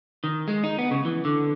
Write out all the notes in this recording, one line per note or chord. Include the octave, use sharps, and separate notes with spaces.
D#3
G#3
D#4
B3
C#3
E3
D3